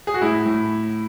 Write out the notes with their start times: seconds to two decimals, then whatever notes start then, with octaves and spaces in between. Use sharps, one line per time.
0.07 G#4
0.14 F#4
0.22 A2 E4
0.46 A2